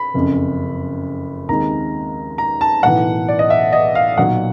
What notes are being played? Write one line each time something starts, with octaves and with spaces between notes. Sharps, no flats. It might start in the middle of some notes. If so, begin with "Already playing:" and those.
Already playing: B5
F#1 F2 C#3
D#2 D#3 G#3 C4 A#5
A#5
A5
B1 A2 E3 F#5
D5
D#5
E5
D#5
F5
B1 A#2 F#3 A#3 F#5